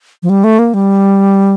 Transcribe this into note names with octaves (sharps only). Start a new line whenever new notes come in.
F3
G3
A3
A#3
G3